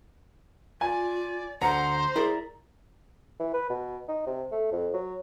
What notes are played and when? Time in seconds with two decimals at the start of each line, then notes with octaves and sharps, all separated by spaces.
0.81 F4 D5 G#5
1.62 D2 D3 C5 F#5 A#5
2.16 E4 G#4 A#4 D5
3.40 E3
3.54 B4
3.70 B2
4.08 D#4
4.27 C3
4.52 A3
4.72 F2
4.94 F#3